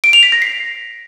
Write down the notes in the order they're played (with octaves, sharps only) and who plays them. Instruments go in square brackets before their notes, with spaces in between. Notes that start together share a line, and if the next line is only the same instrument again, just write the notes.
[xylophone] D7
F7
B6
A#6
C7